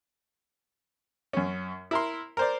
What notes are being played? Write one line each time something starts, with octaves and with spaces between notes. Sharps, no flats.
F#2 C#4
E4 A#4 C6
A#4 C5 D5